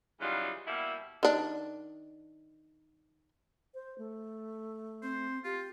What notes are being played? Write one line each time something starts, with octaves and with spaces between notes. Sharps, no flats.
C#3 E3 F#3 G3 D#4 F4
B2 G3 A#3 E4
D#3 D4
C5
A3
C4 C5
F4 G4